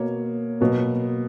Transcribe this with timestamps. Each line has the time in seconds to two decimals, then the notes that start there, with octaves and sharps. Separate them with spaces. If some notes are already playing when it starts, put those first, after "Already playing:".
Already playing: B2 A#3 C#5
0.60 B2 F#3 A#3